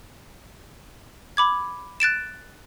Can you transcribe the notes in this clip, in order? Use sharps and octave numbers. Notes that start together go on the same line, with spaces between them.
B5 D6 G#6
F#6 A6 D7 E7